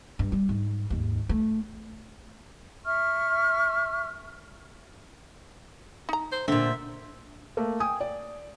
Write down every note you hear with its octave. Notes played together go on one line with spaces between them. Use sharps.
G2
G3
G#2
D#2 G#2
A3
E5 C#6 F6
D#4 A#5
C5
A#2 D3 C4 E5
A3 A#3
G5 G#5 D#6
D5